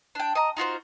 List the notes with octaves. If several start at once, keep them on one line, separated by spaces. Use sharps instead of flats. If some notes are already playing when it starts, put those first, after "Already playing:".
D4 G5
D#5 A#5
D#4 F4 F#4 C5